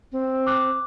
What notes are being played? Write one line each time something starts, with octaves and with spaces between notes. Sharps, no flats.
C4
D6 F#6